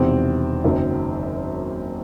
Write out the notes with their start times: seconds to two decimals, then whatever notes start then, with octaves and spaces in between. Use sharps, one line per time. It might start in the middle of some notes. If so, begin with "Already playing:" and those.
Already playing: E1 E2 C3 D#3 C4
0.64 F#1 F#2 D#3